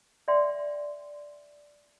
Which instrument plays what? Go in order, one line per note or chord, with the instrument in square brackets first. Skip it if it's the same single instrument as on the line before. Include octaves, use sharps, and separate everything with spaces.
[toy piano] D5 E5 G5 C6